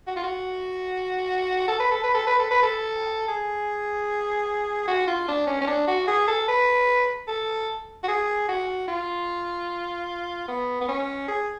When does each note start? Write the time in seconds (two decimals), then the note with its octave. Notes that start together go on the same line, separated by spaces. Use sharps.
0.07 F#4
0.16 F4
0.24 F#4
1.68 A4
1.80 B4
1.91 A4
2.04 B4
2.14 A4
2.27 B4
2.39 A4
2.51 B4
2.63 A4
3.28 G#4
4.88 F#4
5.08 F4
5.28 D4
5.47 C#4
5.62 C#4
5.67 D4
5.88 F#4
6.07 G#4
6.28 A4
6.48 B4
7.28 A4
8.04 F#4
8.08 G#4
8.48 F#4
8.88 F4
10.48 B3
10.81 B3
10.88 C#4
11.28 G#4